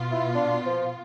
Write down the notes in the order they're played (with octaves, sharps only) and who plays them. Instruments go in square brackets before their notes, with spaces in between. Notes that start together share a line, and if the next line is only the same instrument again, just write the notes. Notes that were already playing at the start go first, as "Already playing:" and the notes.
Already playing: [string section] B2 B3 F4
[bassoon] E4
D4
F3